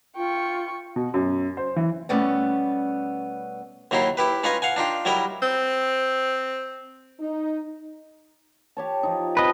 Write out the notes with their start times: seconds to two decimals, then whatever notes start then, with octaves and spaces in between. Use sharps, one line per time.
0.17 F4 G5 C#6
0.96 B2
1.14 F#2
1.57 C5
1.76 E3
2.09 B2 G3 A3 B3 C#4
3.91 D#2 F#3 D#4 E4 C6
4.17 E4 G4 B4
4.44 C#4 D#4 F4 B4 D#5 G#5
4.62 F5 F#5 G#5
4.76 D4 D#4 F4 G5
5.05 F#3 G3 E4 A#4 D#5
5.43 C4
7.20 D#4
8.77 G4 C#5 A5
9.03 F3 D#4
9.37 C4 B4 D#5 A5